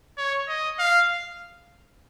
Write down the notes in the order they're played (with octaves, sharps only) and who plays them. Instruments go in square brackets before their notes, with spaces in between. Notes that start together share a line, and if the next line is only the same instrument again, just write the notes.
[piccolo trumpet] C#5
D#5
F5